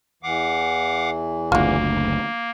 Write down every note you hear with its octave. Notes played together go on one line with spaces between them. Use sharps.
E2 E3 F5 F#5 D6
F#1 D2 A#3 F4 F#4